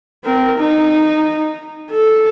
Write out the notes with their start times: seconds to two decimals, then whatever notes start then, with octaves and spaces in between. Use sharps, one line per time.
0.24 C4 A#4
0.58 D#4
1.91 A4